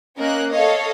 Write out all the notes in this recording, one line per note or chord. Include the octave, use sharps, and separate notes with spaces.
A#3 C#4 A#4 D#5 F#6
A4 C#5 D#5 F5